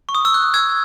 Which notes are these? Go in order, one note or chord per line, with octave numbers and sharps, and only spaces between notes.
C#6
D#6
E6
F#6
E6 G#6